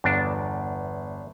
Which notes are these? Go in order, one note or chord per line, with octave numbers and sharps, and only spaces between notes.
G1 E2 D4